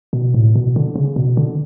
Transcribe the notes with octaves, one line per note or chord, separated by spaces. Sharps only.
B2
A2
B2
D3
C#3
B2
D3